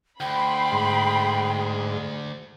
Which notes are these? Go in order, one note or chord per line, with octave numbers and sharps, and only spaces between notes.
D2 G5 B5 C6
G#2